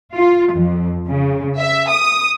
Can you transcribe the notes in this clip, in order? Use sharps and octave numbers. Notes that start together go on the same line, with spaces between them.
F4
F2
C#3
E5
D#6